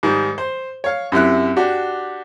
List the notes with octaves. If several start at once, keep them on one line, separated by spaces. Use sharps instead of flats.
G#2 D#3 G3
C5
C#5 F5
F#2 C3 E4 F#6
D4 F#4 G4